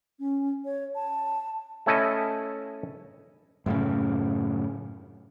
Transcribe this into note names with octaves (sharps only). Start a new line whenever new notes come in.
C#4
C#5
A5
A3 C#4 E4 A4 D#5 G#5
F#2 A2 C#3